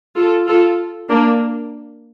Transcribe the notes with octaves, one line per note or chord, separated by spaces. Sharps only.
F4 A4
F4 A4
A#3 D4